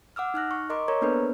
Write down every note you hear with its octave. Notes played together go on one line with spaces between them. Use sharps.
F#5 D6 E6 F6
D#4 F6 F#6 A#6
C#6
A#4 D#5 A#5 C6 D6
A#4 C#5 A#5 C#6 G#6
A#3 B3 D4 A4 B4 C5